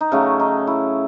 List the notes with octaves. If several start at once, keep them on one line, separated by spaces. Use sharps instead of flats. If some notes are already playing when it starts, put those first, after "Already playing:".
D#4
C#3 F#3 A3 C#4
D#4
E4